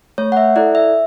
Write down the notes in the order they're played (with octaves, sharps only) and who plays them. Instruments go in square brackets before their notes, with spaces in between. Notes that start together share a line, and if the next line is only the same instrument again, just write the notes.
[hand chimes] A3 C#5
F#5
E5
E4 A4 D5
E5